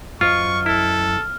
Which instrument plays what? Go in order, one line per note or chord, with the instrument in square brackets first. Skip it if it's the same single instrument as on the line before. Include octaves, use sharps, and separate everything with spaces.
[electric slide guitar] F#2 C5 D#5 [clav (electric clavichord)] F4 [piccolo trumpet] C#6 [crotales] F6
[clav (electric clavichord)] E4 [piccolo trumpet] A4